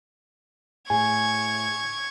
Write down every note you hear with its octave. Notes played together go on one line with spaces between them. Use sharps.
A2 G#4 G#5 C#6 G#6